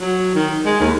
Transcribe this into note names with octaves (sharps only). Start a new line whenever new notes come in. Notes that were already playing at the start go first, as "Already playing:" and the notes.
F#3
D#3
G#3
D#2